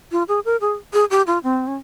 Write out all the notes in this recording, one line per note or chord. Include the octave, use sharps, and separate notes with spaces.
F4
G#4
A#4
G#4
G#4
G4
F4
C4
C#4